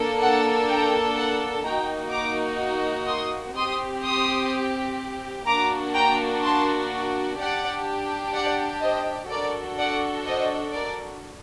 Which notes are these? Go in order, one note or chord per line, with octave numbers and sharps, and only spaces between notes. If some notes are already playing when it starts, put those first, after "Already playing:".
Already playing: A#3 D4 A4
F#5 A5
G5 A#5
F#5 A5
A#3 D#4 F#4 G5 A#5
A#5 D6
C6 D#6
C4 G4 C6 D#6
C6 D#6
A#3 D4 F#4 A#5 D6
G5 A#5
A5 C6
D4 G4 D5 F#5
D5 F#5
C5 D#5
D4 F#4 A4 A#4 D5
D5 F#5
C5 D#5
A#4 D5